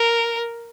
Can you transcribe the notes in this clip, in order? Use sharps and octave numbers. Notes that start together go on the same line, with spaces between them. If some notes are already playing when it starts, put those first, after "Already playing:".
Already playing: A#4